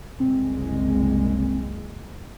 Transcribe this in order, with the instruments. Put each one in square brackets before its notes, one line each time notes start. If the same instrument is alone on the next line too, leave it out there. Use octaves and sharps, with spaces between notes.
[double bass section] F#1 C2 G#3 [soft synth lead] C4